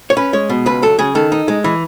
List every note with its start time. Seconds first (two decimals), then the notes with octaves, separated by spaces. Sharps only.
0.10 C#5
0.17 C#4 B4
0.33 G#3 C#5
0.50 B2
0.66 C#2 B4
0.82 F#3 A4
0.99 C#3 G#4
1.15 D#3 A4
1.32 D#4
1.48 G#3
1.64 E3